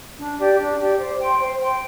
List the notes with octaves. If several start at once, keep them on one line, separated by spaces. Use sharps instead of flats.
D4
G4 D5
D4
G4 D5
C5
G5 C6
C5
G5 C6